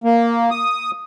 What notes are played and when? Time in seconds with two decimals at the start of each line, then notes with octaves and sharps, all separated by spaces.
0.04 A#3
0.51 D#6